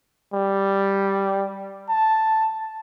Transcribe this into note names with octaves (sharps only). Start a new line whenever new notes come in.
G3
A5